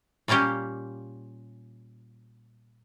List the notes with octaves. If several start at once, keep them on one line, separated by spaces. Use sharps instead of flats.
A#2 G3 A#3 C#4 G4